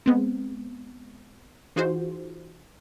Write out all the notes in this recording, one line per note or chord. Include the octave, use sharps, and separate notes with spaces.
G#3 B3 C4
E3 D#4 F4 F#4 G#4 C5